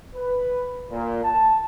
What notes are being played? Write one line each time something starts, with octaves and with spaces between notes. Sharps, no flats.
B4
A#2
A5